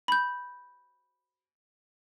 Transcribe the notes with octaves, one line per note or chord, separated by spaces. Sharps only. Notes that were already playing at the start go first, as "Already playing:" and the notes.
B5 G6